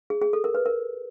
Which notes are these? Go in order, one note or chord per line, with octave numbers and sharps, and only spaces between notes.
G#4
G#4
A4
A#4
B4
A#4